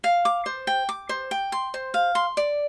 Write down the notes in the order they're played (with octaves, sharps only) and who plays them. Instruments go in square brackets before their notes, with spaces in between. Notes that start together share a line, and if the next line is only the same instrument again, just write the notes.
[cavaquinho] F5
D6
C5
G5
D6
C5
G5
C6
C5
F5
C6
D5